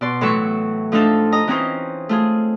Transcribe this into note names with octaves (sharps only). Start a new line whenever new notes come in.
B2 D5 C6
A2 E3 F#3 E5 C#6
F3 A3 D4 D#4 F4 A4
D#5 A#5 D#6
E3 C4 C#4 D#4 F4 C5
A3 F4 G#4